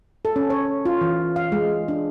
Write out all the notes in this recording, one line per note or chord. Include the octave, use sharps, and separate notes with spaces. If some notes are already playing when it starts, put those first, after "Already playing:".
A4
C#4
C#5
F4
E3
F5
G#3
D4